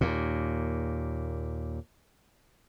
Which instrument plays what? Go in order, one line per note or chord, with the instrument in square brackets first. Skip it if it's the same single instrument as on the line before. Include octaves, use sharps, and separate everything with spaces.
[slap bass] D#2 A#2